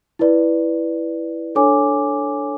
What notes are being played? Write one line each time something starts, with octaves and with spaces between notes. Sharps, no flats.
E4 B4 D5
D4 A4 C#5 G#5 D6